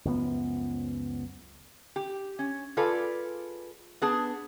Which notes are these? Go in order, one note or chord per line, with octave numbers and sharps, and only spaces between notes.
C#2 F#2 F3 B3
G4
C#4
F4 G#4 A4 B4 D5
B3 D4 G#4 A5